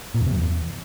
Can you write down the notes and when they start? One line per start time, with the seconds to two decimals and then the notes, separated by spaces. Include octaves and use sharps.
0.14 A#2
0.20 E2
0.26 C3
0.32 F#2
0.38 E2